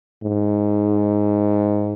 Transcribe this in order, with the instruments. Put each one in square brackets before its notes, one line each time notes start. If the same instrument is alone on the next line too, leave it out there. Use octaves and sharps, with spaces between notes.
[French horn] G#2